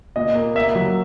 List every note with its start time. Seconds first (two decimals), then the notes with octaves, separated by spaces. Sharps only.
0.16 A#2 D#5
0.35 A#3
0.55 A#3 E5
0.75 F#3